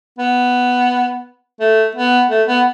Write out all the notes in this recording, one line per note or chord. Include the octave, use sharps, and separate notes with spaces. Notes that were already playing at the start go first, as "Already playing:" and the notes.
B3
A3
B3
A3
B3